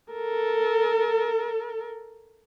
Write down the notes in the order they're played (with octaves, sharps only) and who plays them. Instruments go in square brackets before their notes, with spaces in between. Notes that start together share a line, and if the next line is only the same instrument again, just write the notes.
[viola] A4 A#4